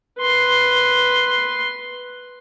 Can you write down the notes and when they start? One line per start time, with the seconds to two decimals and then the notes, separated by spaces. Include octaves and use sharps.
0.19 B4 C6